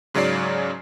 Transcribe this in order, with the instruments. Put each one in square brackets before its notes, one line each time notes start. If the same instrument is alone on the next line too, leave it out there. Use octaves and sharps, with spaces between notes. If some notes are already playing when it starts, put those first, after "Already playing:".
[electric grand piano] G#2 C#3 F#3 C#5 D5 C7